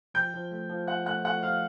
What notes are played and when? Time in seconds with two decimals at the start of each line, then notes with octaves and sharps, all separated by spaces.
0.14 F3 G5 G6
0.34 F3
0.51 A3
0.69 F3
0.87 F3 F#5 F#6
1.06 A3 F#5 F#6
1.24 A3 F#5 F#6
1.43 F3 F5 F6